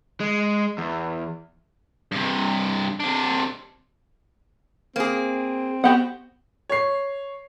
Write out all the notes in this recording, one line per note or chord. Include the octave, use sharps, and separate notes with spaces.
G#3
E2
G2 C3
C3 D4
A#3 C4 G#4
B3 F#4 G4 F#5
C#5 C7